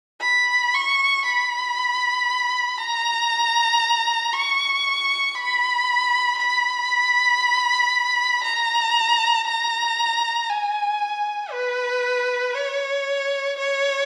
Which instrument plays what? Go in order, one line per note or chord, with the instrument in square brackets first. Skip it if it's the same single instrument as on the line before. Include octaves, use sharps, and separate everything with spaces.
[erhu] B5
C#6
B5
A#5
C#6
B5
B5
A#5
A#5
G#5
B4
C#5
C#5